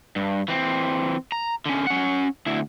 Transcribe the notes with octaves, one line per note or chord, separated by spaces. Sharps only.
G2
E3 C4
A#5
D3 C#4
C#4 F#5
D2 E4